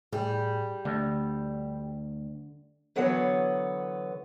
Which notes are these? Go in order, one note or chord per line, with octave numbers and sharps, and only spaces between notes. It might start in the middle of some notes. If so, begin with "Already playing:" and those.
A2 G3 G#4
D2 D3 A3
D3 E3 F#3 B3 B4 C#5